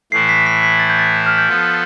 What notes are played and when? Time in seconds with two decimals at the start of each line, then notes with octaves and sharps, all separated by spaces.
0.12 A2 E3 A3 E4 C7
0.29 B6
0.46 B6
0.63 B6
0.80 A6
0.89 G6
0.99 A6
1.14 G6
1.26 F6
1.38 G6
1.48 F3 B3 F4 A4